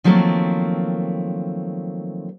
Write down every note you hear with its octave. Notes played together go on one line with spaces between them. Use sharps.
D#3 F3 F#3 A3 A#3 C4